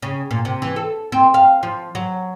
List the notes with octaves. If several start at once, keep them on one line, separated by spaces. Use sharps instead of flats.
C#3
A#2
C3
E3
A4
C4
F5
F3
F#3